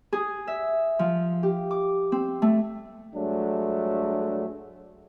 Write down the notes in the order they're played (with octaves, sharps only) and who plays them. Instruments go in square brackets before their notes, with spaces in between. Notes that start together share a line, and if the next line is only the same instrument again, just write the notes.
[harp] G#4
E5
F3
G4
D6
C4
A3
[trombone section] G2 F#3 G#3 A3 D4